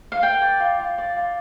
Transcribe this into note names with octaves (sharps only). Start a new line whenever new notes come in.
F5
A#4 G5
D5
F4
F4
D5
F4